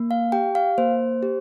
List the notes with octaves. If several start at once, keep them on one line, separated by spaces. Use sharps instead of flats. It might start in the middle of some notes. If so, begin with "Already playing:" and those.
Already playing: A#3
F5
G4 G5
F5
A#3 C5
G4